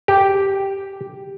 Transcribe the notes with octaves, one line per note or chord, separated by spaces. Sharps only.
G4